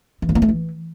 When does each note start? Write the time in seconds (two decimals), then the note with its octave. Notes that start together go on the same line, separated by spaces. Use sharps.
0.22 E3
0.29 G2
0.35 A#3
0.42 A3
0.48 E3